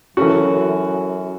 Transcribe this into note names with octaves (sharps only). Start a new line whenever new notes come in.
F#2 E3 A3 C#4 F#4